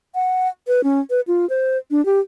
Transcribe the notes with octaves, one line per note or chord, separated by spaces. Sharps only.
F#5
B4
C#4
B4
F4
C5
D4
G4